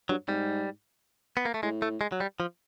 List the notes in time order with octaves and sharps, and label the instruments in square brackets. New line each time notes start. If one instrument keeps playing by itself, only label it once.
[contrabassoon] G2 [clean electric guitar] F#3
[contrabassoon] G#2 [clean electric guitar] G3
[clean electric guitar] B3
A#3
A3
[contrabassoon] A2 [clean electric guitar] G#3
[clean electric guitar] A3
G#3
F#3
G3
F3